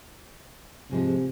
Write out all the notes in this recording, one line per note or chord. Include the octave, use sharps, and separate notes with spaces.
G#2 C3 F3 G#3